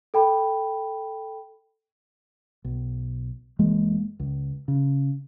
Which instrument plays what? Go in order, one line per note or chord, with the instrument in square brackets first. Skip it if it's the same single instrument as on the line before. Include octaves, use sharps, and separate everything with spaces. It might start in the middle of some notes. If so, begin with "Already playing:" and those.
[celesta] A4 G5 B5
[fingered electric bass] B1
F#1 E3 G#3 A#3
C#2
C#3